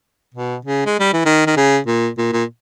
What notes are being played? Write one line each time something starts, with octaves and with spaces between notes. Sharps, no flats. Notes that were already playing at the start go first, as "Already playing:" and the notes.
B2
C#3
G#3
G3
E3
D#3
D#3
C#3
A#2
A#2
A#2